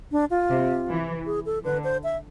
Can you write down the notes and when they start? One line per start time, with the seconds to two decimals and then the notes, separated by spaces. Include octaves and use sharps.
0.12 D4
0.30 F4
0.50 C3
0.89 E3
1.26 G#4
1.46 A4
1.65 D3 B4
1.84 C5
2.04 E5